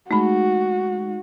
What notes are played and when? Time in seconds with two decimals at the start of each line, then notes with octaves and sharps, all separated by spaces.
0.11 G#3 A3 D#4 F#4 B5